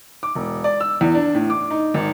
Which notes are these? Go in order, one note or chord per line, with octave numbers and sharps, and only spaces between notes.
D6
E1
D5
E6
E2
D4
A2
D6
D#4
G#1